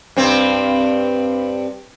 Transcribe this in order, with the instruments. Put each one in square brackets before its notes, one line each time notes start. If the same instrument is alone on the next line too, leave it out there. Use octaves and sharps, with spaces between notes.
[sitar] G2 C4